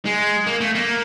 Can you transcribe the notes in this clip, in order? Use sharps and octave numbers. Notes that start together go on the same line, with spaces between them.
G#3
A#3
A3
A#3